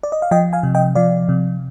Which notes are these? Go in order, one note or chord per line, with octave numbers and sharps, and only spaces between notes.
D5
D#5
F5
F3 D#5 G5
F5 G#5
C3
D#5 G5
F3 D5 F5
C3